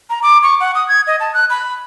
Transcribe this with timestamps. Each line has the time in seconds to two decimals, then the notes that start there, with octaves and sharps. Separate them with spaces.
0.10 A#5
0.23 D6
0.43 C#6
0.60 F#5
0.75 D#6
0.88 G#6
1.07 D#5
1.20 A5
1.34 F#6
1.50 B5